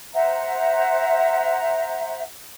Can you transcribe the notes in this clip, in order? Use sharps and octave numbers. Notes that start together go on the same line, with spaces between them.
C5 E5 F#5 A#5